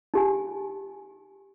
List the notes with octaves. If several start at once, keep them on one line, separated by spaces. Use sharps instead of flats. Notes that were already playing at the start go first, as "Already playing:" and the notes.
D#4 G4 G#5